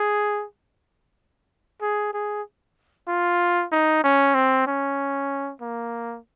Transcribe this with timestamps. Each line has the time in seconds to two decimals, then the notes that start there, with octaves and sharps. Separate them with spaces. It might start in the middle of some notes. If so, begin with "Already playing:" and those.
Already playing: G#4
1.82 G#4
2.14 G#4
3.08 F4
3.72 D#4
4.04 C#4
4.35 C4
4.67 C#4
5.61 A#3